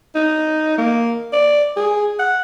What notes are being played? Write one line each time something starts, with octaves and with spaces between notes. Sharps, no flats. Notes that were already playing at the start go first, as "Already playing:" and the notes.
D#4
A#3
D5
G#4
F#5